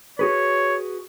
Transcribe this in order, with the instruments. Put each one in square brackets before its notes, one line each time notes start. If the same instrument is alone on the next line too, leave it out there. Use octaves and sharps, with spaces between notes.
[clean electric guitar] F#4 G#4 B4 [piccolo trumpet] C#5